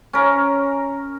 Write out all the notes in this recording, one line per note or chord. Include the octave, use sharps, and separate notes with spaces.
C#4 A#4